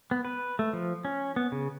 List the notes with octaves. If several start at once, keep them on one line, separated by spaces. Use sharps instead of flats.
B3
B4
A3
F3
C#4
B3
C#3